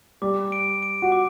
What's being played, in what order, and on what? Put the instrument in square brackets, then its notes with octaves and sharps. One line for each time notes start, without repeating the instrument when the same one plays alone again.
[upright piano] G3 [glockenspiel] D6
[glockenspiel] D7
D7
[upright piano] F#4
[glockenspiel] D6